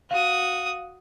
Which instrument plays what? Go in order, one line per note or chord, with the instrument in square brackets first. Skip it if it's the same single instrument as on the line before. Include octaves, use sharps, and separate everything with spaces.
[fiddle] F#4 D#6 [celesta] F5